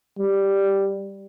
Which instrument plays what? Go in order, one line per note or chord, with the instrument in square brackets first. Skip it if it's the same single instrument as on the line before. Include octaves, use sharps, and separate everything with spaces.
[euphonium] G3